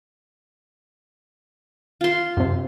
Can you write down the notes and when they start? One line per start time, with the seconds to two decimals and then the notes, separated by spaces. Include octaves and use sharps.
2.01 F4 C6
2.37 F#2 C3